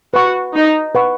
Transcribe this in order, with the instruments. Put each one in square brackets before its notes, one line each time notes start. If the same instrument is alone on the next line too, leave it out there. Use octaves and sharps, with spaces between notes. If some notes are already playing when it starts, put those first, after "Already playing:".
[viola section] F#4 [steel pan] B4 F#5 C#6
[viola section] D#4
[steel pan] B4 F#5 C#6